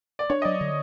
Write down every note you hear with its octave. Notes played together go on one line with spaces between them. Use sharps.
D5
D4 C#5
D#5
F#3 D5
D3